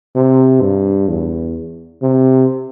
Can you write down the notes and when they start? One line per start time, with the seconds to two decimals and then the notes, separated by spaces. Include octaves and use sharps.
0.15 C3
0.62 G2
1.09 E2
2.02 C3